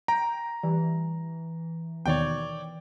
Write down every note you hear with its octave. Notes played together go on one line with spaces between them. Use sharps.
G5 A#5
E3 G3
D#2 B2 D#3 C#5 D5 G5